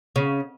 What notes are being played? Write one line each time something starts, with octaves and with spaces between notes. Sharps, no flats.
C#3